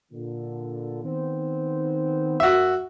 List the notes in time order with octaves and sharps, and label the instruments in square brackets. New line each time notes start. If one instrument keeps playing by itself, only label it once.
[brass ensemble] A#2 D3
D#3 B3 C4
[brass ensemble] F#2 [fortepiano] F#4 E5